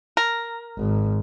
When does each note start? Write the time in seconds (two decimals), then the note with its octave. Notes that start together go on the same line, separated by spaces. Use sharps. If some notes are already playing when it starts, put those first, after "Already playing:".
0.17 A#4
0.78 G#1